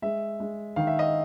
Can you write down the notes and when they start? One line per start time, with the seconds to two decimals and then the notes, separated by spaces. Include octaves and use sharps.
0.02 G#3 E5
0.40 G#3
0.76 D#3 F5
0.87 E5
0.99 D#5